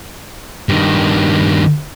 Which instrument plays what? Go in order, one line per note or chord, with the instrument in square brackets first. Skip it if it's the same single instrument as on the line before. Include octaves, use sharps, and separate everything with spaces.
[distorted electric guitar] G2 D#3